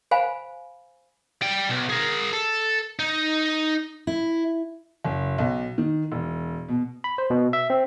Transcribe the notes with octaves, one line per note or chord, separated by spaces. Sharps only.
C5 F5 G#5 B5
G3 G5
B1
G#4 A#4
A4
D#4
E4
F#1
B1
D#3
E1
B2
B5
C5
B2
E5
C4